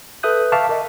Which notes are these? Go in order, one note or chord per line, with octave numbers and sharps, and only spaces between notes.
A4 B4 E5 D#6 F#6 G6
E5 F5 A5 C#6 D6 F6
A#4 D#5 E5